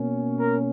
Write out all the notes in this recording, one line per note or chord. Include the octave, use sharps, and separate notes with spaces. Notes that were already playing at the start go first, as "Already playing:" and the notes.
Already playing: B2 A#3 C#4
A#4